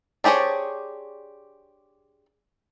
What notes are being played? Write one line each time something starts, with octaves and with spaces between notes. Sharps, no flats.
D4 G4 G#4 C5 C#5